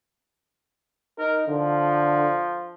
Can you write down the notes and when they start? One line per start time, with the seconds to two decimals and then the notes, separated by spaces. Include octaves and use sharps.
1.19 D#4 A#4
1.48 D3 F3